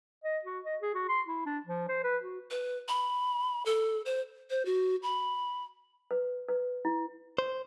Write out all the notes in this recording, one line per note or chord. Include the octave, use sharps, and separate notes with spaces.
D#5
F#4
D#5
G#4
F#4
C6
E4
D4
F3
C5
B4
F#4
B4
B5
A4
C5
C5
F#4
B5
B4
B4
E4
C5